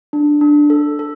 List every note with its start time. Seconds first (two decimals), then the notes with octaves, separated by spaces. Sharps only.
0.13 D4
0.41 D4
0.70 A4
0.99 A4